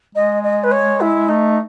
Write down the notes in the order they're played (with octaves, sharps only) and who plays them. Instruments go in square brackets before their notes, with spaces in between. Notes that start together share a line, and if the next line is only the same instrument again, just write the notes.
[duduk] G#3 [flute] D#5
[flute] D#5
B4
C#5
E4
[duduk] A3 [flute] D#4